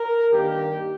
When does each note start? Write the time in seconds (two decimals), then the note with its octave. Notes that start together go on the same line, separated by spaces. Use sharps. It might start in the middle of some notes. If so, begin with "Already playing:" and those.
Already playing: A#4
0.32 G2 D#3 A#3 G4